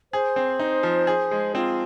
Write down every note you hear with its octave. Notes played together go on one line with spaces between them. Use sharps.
G#4 C5
C4
D#4
F3
G#4
G#3
C4 F4